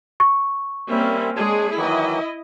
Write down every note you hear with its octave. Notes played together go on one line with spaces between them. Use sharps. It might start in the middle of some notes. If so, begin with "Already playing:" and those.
C#6
G3 A#3 C4 C#4 E5
G#3 D4 G#4 C#5
D#3 E3 F#3 E4 D#5